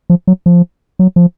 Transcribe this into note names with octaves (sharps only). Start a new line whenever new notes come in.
F3
F#3
F3
F#3
F3